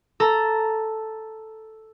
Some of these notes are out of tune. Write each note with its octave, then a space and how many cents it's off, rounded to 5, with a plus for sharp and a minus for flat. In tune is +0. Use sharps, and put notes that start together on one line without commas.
A4 +0 A#5 +0